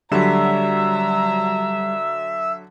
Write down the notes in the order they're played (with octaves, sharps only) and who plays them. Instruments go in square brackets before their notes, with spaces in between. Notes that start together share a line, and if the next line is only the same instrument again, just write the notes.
[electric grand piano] D3 F#3 [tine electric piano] G3 [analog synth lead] E5 [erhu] A#5